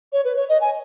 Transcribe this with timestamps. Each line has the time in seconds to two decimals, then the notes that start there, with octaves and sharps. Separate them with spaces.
0.12 C#5
0.24 B4
0.36 C#5
0.48 D#5
0.60 G#5